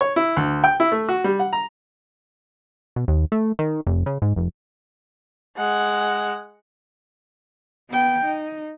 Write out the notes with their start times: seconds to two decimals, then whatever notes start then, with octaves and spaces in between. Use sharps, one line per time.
0.01 C#5
0.16 E4
0.37 D2
0.64 G5
0.80 E4
0.92 A3
1.09 F#4
1.24 G3
1.40 F#5
1.53 A#5
2.96 B2
3.08 D#2
3.32 A3
3.59 D#3
3.87 F1
4.06 C#3
4.22 G#2
4.36 F1
5.56 G#3 F#5
7.90 B3 G5
8.25 D#4